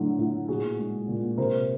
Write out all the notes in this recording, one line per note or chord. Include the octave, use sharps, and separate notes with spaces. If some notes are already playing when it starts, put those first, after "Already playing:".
Already playing: A2 D3 F#3
A2
A#2 F#4 G#4
G#3
A#2
C3 A#4 C5